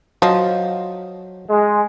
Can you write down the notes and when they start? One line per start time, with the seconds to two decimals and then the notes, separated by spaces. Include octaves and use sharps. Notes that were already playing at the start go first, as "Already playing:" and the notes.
0.22 F3 F#3 D#5
1.48 G#3